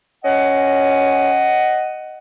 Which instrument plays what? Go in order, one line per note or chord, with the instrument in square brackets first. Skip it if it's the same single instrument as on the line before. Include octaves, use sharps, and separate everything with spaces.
[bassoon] C#4 [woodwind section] D#5 F#5